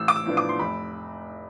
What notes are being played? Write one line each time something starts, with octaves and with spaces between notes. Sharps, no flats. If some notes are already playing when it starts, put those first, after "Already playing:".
Already playing: A1 E6
D6
E6
A2 F3 B3 D4
D6
C6
F1 B5